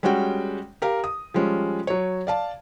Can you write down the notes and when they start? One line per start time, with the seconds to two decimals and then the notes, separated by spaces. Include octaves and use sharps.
0.03 G3 G#3 C#4 F#4 G5
0.82 G4 A#4 F5
1.04 D#6
1.34 F3 G3 G#3 C#4
1.87 F#3 C#5
2.27 D5 F5 A5